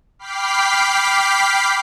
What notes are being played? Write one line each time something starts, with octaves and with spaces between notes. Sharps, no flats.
G5 B5 D6 F6 B6 C7